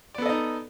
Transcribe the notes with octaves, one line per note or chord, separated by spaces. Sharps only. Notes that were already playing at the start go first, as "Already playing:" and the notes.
B3 D#4 A4 D5 D#5